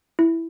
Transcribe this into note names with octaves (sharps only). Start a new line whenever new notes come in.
E4